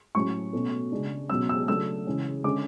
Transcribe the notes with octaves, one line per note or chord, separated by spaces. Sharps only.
A2 F#3 C#4 C#6
B2 A3 C#4
C#3 G#3 D4
B2 F#3 C#4 E6
E6
C#3 F#3 A3 D4 E6
C#3 E3 G#3 C#4
D3 G#3 C#4 D6